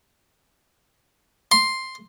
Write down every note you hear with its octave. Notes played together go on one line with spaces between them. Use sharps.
C6